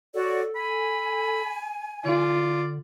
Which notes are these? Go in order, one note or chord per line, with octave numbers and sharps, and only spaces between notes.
F#4 A4 C#5 D5
G#5 B5
D3 F4 D5